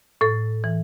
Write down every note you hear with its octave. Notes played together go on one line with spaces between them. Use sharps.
A2 A4
E3